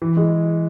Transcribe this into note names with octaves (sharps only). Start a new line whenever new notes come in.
E3
G#3